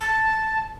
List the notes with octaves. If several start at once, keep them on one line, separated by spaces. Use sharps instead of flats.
A5